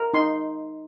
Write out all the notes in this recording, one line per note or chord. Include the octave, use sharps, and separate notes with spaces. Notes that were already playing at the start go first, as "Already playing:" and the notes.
Already playing: A#4
D#4 C6